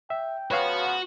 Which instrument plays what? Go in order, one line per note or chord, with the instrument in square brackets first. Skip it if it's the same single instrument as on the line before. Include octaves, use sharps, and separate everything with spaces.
[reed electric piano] E5 [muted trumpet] G5
[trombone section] C#3 F3 B3 [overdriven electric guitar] F#4 [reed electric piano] B4 C#5 F5